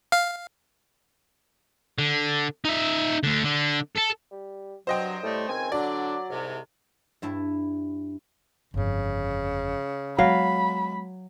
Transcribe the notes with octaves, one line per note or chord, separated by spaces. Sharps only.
F5
D3
D#4 E5
D2 D3
D3
A4
G3
G2 C3 F#3 F#4 C5 D#5 G5
A2 G3 A3
C#2 D#3 C4 G#5
D3 F#3 D4 D5
C2 G#2 C3
G2 E4 E5 A5
G1 F2 C#3
F#3 G#3 B3 F5 B5